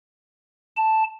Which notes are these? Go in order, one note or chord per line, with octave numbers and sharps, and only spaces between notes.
A5